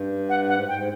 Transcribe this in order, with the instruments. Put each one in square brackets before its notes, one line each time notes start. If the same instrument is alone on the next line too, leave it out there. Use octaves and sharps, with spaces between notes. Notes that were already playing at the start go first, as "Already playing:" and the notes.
Already playing: [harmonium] G2
[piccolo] F#5
[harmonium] A2
[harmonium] G#2 [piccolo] F#5
[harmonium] G#2 [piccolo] G5